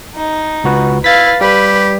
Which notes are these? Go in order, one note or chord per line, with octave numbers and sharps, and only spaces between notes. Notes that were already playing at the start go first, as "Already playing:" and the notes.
D#4
C#2 F#4 B4
E4 B4 F5 A6 B6
G3 G4 B4